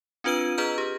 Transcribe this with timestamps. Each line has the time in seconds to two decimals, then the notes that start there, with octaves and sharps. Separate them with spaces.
0.24 C4 D4 F4 B4 E6 D#7
0.58 G#4 B4 D#5 A#5 F6 G6
0.78 G4